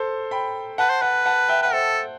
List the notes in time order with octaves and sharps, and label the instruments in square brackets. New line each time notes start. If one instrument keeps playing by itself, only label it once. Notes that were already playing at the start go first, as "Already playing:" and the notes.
Already playing: [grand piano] A4 C5
G5 B5
[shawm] B4 [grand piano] F#5 A5
[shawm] C5
[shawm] B4 [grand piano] F#5 A5
[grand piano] F#5 A5
E5 G5
[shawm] B4 [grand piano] F#5
[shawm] A4 [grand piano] C5 E5